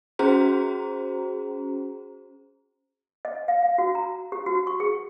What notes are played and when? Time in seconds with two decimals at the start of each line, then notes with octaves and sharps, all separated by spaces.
0.19 C#4 F#4 G#4 C5 A#5
3.25 D#5
3.48 F5
3.63 F5
3.78 F#4
3.95 A#5
4.32 G4
4.46 F#4
4.67 C#6
4.80 G#4